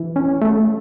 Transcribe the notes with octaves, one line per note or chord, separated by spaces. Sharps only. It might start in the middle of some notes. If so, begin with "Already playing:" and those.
Already playing: E3
C#4
A3